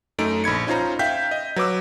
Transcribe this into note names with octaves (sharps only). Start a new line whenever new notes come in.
F#2 A3 D#4 D7
A#1 B5 G#6 C#7
C#4 D#4 F4 C5 A#5
E5 F5 G5 G6 B6
D#5
F#3 B4 D6 E6